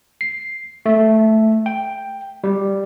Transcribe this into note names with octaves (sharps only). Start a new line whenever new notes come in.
C7
A3
G5
G3